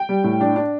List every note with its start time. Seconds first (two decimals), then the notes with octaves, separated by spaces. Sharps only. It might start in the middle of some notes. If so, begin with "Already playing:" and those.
Already playing: G5
0.09 G3
0.24 A2
0.41 D4
0.56 D4